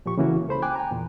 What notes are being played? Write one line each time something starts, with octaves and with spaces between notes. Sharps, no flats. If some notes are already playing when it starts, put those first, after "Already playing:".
A#2 F3 G4 C#6
C#3 E3 A#3 C#4 E4 F#4
C#2 A4 C5 B5
G5 G#5 D6 F#6
G5 G#5 A#5
E2 A#2